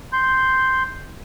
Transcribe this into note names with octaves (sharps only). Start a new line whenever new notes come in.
C6 G6